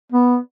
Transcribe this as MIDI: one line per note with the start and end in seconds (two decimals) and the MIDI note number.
0.12 0.37 59